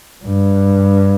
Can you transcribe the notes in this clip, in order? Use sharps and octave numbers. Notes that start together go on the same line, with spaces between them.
G2